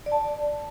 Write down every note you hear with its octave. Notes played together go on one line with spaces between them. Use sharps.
D5
A5
D5